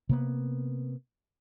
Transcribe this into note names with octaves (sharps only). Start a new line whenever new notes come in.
C3 A#3 B3